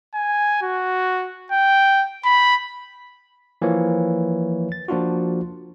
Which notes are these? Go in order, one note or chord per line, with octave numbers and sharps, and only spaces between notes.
G#5
F#4
G5
B5
E3 F3 A#3 C#5
A6
F3 A#3 D4 F4 F#4